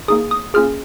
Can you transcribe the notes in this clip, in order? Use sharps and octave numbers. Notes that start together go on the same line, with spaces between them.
A#3 D#4 G#4 D#6
D#6
A#3 C#4 F4 G#4 F6